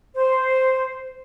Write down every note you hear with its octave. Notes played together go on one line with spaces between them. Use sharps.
C5